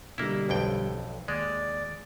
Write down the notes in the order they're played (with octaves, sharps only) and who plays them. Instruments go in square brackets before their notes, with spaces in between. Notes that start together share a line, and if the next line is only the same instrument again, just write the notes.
[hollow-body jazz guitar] B2 D3 G3 [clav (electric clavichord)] A#3 E4
[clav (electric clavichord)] B1 F2 G5
[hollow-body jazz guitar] D#2 [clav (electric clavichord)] G#3 [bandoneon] D5